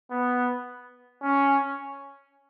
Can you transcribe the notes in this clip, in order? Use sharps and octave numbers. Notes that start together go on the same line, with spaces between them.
B3
C#4